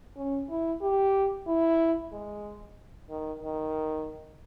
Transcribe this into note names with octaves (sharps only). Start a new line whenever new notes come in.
C#4
E4
G4
E4
G#3
D#3
D#3